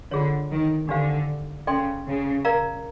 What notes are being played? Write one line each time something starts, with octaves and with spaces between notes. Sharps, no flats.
D3 F4 G#4 C#5
D#3
D3 D4 G4 C5 F5
C#3 A4 D5 G5 C6
C#3
A#4 D5 F5 A#5